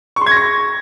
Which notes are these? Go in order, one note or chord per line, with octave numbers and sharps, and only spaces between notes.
C#6
C6
G#6
A#6
C#6